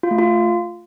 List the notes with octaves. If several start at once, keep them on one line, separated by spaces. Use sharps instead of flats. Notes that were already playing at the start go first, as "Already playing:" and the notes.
F4
A3
F4